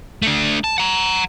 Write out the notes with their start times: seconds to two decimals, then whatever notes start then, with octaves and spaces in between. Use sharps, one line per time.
0.22 A3 D4
0.64 A5
0.78 F#5 A#5